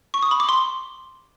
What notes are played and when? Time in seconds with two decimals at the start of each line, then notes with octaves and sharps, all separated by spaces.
0.14 C#6
0.23 D#6
0.31 B5
0.40 D6
0.49 C6